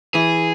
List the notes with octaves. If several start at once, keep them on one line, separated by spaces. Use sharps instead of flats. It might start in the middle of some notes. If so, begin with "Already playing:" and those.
E3 G#4